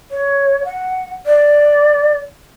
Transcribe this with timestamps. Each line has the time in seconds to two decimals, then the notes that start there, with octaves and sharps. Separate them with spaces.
0.11 C#5
0.65 F#5
1.26 D5